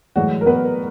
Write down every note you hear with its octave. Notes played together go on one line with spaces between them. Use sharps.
A2 E3 F#3 G#3 F#4
A#4
B3 B4